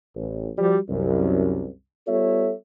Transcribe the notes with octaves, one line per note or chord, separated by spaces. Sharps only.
A1
F3 G3 F#4
C2 F#2
G3 B3 F4 A4 C#5 E5